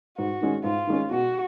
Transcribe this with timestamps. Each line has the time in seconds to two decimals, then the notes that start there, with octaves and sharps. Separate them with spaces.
0.18 G#2 F#4
0.41 D#3 G#3 C#4
0.64 G#2 F4
0.87 D#3 G#3 C#4
1.10 B2 F#4